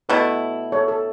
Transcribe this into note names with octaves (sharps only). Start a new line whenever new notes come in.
B2 A3 E4 B4
A4 C#5
A4